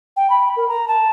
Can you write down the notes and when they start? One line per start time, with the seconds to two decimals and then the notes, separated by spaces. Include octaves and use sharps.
0.16 G5
0.29 B5
0.56 A#4
0.68 A#5
0.88 A5